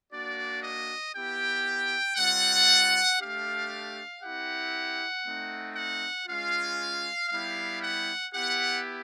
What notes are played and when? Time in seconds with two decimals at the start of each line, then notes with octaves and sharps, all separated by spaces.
0.11 A#3 D4 F#4 D5
0.62 D#5
1.13 B3 E4 G4 G5
2.16 G3 C4 F4 F#5
3.19 A3 D4 G4 F5
4.22 C4 E4 G4 F#5
5.24 A3 C4 D#4
5.76 F#5
6.27 G#3 C#4 F4 F5
7.29 G3 B3 E4 G4 F5
7.81 F#5
8.31 B3 E4 G4 F#5